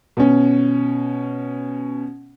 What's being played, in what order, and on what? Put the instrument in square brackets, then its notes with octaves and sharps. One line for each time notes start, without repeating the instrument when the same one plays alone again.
[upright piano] B2 C#4